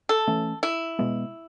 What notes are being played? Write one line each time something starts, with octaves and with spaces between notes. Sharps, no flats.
A4
E3 A3 C#4
E4
B2 G#3 B3